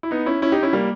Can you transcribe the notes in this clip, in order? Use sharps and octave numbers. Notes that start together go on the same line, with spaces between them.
E4
B3 D#4
C#4 E4
C#4 E4
D#4 G4
C#4 E4
G3 A#3